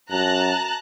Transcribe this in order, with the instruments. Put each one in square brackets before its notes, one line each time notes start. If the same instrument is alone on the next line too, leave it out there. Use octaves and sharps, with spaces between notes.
[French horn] F#2 [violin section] A5 A#5 F#6